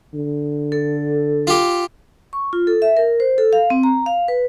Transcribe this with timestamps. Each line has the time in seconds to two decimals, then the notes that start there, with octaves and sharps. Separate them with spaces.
0.14 D3
0.72 A4
1.47 F4 G4
2.33 C#6
2.53 F4
2.67 A4
2.82 E5
2.97 A#4
3.20 C5
3.38 A4
3.53 F5
3.70 C4
3.83 A#5
4.06 F5
4.28 B4